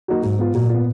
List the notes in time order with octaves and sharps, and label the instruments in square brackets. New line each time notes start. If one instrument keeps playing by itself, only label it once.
[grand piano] F#3 A#3 D#4 F#4
[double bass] G#2 [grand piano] F#3
[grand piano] B3 F4
[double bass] A#2 [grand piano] F#3
[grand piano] B3 F4